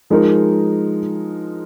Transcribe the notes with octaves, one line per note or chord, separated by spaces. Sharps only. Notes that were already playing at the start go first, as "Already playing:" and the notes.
F3 G#3 D#4 A#4